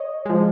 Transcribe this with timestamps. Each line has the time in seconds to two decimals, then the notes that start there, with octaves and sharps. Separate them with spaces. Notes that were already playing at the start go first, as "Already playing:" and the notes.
Already playing: C#5 D#5
0.26 F3 G#3